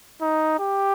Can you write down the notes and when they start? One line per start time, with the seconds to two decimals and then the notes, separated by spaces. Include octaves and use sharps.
0.21 D#4
0.59 G4